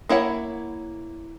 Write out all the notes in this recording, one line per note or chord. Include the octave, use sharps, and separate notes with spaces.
A#3 E4 C#5 F#5